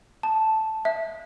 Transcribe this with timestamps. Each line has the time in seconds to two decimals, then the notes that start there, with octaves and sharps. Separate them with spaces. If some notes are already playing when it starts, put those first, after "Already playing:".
0.23 A5
0.85 E5